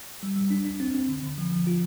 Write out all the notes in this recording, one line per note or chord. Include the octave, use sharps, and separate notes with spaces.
G3
G3
D4
D4
C4
C4
D3
D3
F3
F3
F4